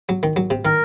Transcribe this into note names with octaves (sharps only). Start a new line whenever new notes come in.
F#3
D#3
F#3
C3
D#3 A#4